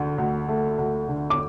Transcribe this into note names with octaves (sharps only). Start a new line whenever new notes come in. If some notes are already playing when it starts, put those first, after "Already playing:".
Already playing: D2 D3
D2
A3
D2
D3
D6